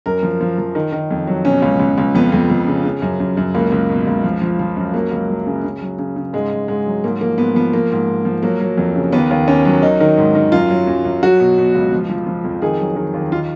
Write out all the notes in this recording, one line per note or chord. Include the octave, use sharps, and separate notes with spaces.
F#2 A#4
F3
F3
F3
D#3
D#3
F2
F#3
B2 C#4
C#2
C#2
C#2
F2 B3
F2
F2
C#3
C#3
F#2
F#2
F#2
C#2 A#3
C#2
B2
C#2
F3
F3
F3
F#2
F#3 A#3
C#2
F#3
C#3
C#3
F#3
C#3
C#3
G#2 G#3
G#2
G#2 G#3
F#3
G#2 A#3
F3 A#3
G#2 B3
F3 B3
F3 A#3
G#2
G#2
F3
F#3 A#3
F#3
F2
C#3
D#2 B3
D#2
D#2 C#4
F#3
D#3 D#4
D#3
G#2
D#3
F#2 F4
F#3
F#2
F#2
F#3 F#4
B2
B2
C#2
F3
F3
F3
F2
D#3 G#4
F#3
D#3
D#2
D#3 F4